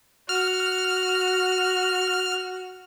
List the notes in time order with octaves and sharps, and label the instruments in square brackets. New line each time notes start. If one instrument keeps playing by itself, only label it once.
[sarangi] F#4 [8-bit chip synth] F6